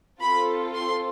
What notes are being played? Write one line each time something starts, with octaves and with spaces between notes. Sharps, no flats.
C4 F4 A4 B5
C6